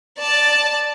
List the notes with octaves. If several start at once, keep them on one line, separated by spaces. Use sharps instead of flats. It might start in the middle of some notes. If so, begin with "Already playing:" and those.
D5 A5